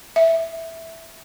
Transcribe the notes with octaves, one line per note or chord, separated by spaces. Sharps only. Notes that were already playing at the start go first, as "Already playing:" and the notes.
E5